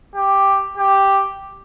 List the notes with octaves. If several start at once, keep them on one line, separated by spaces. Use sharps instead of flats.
G4
G4